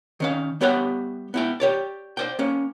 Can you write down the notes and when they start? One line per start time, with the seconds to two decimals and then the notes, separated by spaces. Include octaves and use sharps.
0.20 D#3 C#4 F5
0.61 G3 B3 G4 C#5 E5 F#5
1.34 B3 E4 G5
1.60 G4 C#5 D5
2.17 C5 D5 G5
2.39 A#3 C#4